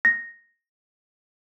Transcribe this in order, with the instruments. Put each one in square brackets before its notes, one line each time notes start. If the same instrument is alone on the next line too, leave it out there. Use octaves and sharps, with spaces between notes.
[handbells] A#6